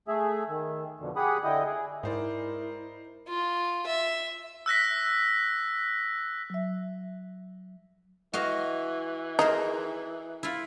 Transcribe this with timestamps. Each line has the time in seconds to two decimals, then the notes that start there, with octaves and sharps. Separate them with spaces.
0.08 A3 G#4 E5
0.49 D#3
1.00 F2 B2 D3
1.16 G4 G#4 F#5 B5 D#6
1.44 D3 E4 D#5 G5 D#6
1.65 G#4
2.03 G#2 D#4 E4 A#4 C5 D5
3.29 F4
3.87 E5
4.66 E6 F#6 A#6 B6
6.50 F#3 E5
8.33 E3 F#4 D#5 F5
9.39 D#4 G#4 A#4 C5
10.43 E4 F4